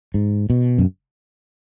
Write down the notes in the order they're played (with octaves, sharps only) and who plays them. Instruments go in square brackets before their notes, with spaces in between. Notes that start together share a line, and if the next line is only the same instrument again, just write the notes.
[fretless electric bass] G#2
B2
F#2